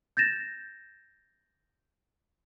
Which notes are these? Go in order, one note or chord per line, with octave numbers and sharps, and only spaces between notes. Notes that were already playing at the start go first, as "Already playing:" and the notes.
G6 A6 A#6 E7